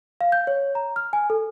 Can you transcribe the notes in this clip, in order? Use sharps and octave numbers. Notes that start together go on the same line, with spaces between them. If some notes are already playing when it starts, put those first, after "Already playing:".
F5
G6
C#5
A#5
F6
G#5
A4